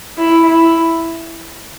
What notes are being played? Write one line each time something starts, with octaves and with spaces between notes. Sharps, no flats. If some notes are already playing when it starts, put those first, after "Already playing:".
E4
E4